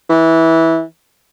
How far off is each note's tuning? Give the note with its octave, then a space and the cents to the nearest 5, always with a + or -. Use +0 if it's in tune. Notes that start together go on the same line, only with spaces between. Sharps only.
E3 -15